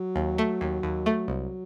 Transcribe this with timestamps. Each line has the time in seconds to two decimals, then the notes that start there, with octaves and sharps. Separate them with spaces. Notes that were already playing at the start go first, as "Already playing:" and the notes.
Already playing: F#3
0.16 D#2
0.38 A3
0.61 D#2
0.83 D#2
1.06 A3
1.28 C2 F#3